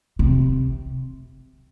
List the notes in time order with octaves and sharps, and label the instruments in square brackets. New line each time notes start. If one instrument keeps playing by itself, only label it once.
[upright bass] C3